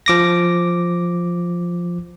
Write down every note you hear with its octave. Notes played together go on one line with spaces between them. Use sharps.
F3 D6 A#6